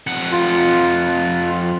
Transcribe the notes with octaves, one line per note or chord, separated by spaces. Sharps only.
F2 F#5
F4